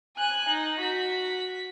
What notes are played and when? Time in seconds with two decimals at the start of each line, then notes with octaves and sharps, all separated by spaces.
0.17 G#5 F#6
0.49 D#4
0.80 F#4 B6